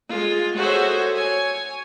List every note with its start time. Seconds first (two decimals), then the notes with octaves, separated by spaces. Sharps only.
0.11 G#3 F4
0.57 F#4 G#4 A4 C5 C#5 E5
1.13 C#5 G#5